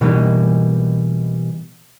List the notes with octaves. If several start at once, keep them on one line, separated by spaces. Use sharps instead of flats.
B2 E3 G3 A#3 D#4